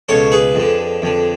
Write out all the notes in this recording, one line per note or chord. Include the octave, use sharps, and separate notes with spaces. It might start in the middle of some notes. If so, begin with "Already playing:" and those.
C#2 B2 A4 C#5
G#4 B4
F2 D3
F2 D3